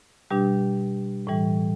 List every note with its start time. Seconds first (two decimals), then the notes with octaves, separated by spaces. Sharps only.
0.31 B2 G3 D4 G4
1.27 A2 E3 G3